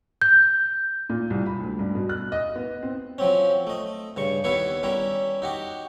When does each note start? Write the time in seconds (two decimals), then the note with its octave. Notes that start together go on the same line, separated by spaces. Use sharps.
0.22 G6
1.09 A#2
1.30 C2
1.46 B5
1.60 D2
1.79 G2
1.95 B2
2.09 F#6
2.32 D#5
2.55 B3
2.82 C4
3.18 F3 F#3 C4 C#4
3.67 A3 D#5
4.17 G2 C#3 C#6
4.44 D#2 B3 E4 B4 C#5 C#6
4.83 G3 C#4 E4 A#4
5.42 D#4 F#4 G4